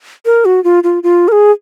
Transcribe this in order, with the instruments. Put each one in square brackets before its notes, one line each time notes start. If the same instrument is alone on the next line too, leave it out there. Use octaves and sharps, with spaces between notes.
[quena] A#4
F#4
F4
F4
F4
A#4
G#4